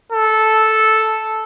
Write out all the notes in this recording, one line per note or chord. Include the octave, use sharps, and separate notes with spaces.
A4